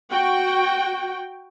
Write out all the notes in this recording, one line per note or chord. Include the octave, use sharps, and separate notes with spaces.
F#4 G5